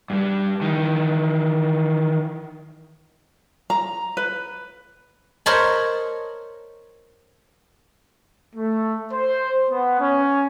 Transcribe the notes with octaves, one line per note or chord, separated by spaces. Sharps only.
G2 G3
D#3 E3
A#5
B4
A#4 C5 C#5 D#5 A5 B5
A3
C5
B3
C#4